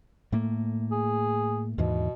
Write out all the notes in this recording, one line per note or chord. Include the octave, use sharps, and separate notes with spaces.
A2 A3 A#3
G#4
D#2 G#2 B2 E3